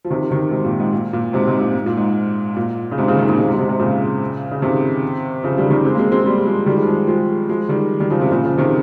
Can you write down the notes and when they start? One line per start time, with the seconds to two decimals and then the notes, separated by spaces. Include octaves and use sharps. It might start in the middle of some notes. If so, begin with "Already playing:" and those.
0.05 F3
0.10 C3 D#3
0.30 C3 D#3
0.51 G#2 C3
0.65 A#2
0.79 G#2
0.93 A#2
1.13 A#2
1.33 G#2 C3
1.47 G#2 C3
1.61 A#2
1.75 G#2
1.86 A#2
1.97 G#2
2.57 A#2
2.91 C#3
2.98 G#2 C3
3.08 A#2 C#3
3.18 C3 D#3
3.29 A#2 C#3
3.38 G#2 C3
3.48 G#2 C3
3.59 G#2 C3
3.69 G#2 C3
3.79 A#2 C#3
4.51 C#3
4.62 C3 D#3
5.43 C#3 F3
5.58 D#3 G3
5.71 D#3 G3
5.85 G#3 C4
5.94 A#3
5.98 G#3 C4
6.12 G#3 C4
6.26 G3 A#3
6.46 F3 G#3
6.66 D#3 G3
6.76 F3 G#3
6.87 F3 G#3
7.07 F3 G#3
7.49 F3 G#3
7.69 D#3 G3
8.00 D#3 G3
8.10 C#3 F3
8.21 C3
8.31 A#2 C#3
8.45 C#3 F3
8.58 C3 D#3